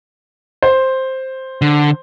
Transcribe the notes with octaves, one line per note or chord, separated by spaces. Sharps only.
C5
D3